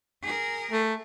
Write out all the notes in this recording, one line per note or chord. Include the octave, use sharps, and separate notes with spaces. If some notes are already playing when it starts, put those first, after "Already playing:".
G#4 A#4
A3